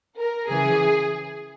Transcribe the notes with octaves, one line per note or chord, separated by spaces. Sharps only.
A#4
C#3 E3 G#4